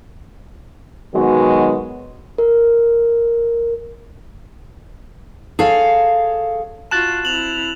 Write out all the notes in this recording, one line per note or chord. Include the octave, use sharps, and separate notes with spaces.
B2 D#3 F#3 G#3 B3 F#4
A#4
G#4 A4 C#5 F5
F4 F#4 A5 F#6 A6 E7
C4 E4 F7 F#7